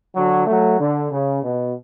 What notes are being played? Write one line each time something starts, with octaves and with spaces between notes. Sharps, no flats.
D3 F#3
F#3 A3
D3
C#3
B2